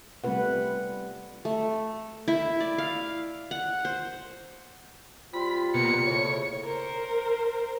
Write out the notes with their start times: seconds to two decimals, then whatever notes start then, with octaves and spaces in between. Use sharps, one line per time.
0.24 G3 A3 C4 F4 B4 F#5
1.45 A3
2.28 E4
2.60 D5
2.78 F5
3.51 F#5
3.85 C5
5.34 G3 C4 F4 B5
5.74 B2 A#3 C#7
6.06 A2 C#3 C#5
6.64 A#4 C5